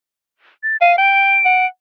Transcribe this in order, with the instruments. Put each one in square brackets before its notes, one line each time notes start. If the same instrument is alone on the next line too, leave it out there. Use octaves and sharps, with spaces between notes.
[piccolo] A6
[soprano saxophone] F5 [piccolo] D#7
[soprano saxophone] G5 [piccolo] D7
[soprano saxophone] F#5